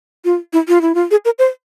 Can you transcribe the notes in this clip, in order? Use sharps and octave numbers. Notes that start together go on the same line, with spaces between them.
F4
E4
F4
E4
F4
G#4
A#4
C5